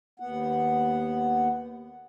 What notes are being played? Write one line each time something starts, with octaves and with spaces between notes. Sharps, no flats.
D#2 B3 F#5